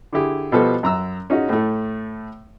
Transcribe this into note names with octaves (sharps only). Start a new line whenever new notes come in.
D3 E4 G4 G#4
B2 F3 G3 B3 A4
F#2 A#5 E6
C#4 D#4 F4 F#4 G#4
A2 A3